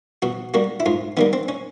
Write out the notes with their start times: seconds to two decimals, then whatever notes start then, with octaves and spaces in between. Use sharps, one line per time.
0.22 B2 F#4
0.54 G3 A#3 F#4
0.80 E4
0.86 G#2 F4
1.17 D#3 G3 A#3 B3
1.33 C4
1.48 C#4